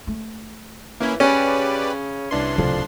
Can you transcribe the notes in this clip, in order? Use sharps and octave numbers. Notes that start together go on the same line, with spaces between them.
A3
E3 A#3 C#4 E4
C#3 C#4 G4 B4 D5
C2 E3 D4 C6
D1 F2 C#3